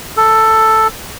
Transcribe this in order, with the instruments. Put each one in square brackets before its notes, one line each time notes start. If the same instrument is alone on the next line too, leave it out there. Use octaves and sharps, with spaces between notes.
[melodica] A4